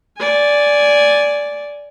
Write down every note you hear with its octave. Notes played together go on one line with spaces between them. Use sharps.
D5 G#5